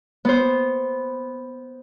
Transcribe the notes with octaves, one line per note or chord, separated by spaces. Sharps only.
B3 C5